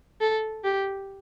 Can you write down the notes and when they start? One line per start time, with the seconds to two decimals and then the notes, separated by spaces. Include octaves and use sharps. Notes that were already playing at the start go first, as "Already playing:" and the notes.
0.21 A4
0.64 G4